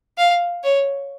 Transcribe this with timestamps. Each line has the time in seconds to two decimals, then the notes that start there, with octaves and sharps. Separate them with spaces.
0.18 F5
0.63 C#5